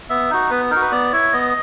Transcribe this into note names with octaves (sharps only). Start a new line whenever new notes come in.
B3 E5
D#4 F#4
B3 B4
D#4 F#4 A#4
B4
B3 D5
E4 C#5
B3 D#5